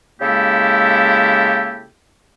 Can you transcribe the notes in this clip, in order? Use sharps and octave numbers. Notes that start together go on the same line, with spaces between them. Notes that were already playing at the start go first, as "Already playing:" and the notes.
C#3 G#3 A#3 E4 G4 A4